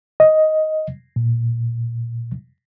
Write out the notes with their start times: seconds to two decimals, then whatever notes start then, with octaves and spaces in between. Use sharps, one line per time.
0.20 D#5
1.16 A#2